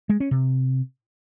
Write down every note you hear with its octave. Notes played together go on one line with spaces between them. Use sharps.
G#3
C#4
C3